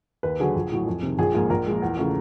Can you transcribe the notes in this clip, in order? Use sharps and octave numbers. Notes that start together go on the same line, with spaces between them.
D#2 B4
D3 F#3 G#4
A#1
A2 F#3
F2
C3 D#3
A#1 G#4
G#2 F3 A#3 G#4
A#1 A#4
A#2 F3 G#3
E2
C#3 F3 A3